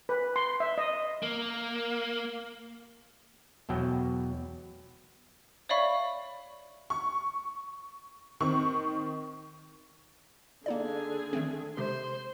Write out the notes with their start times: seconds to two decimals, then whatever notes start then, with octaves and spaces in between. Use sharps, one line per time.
0.09 B4
0.36 C6
0.60 E5
0.78 D#5
1.23 A#3
3.69 E2 B2 F#3 G5
5.69 C#5 D5 E5 F5 B5 C#6
6.90 C#6
8.41 D#3 C4 C#6
10.66 D3 A#3 D#4 G#4 D5
11.33 D#3 A3 C4
11.77 C3 G#3 G4 C5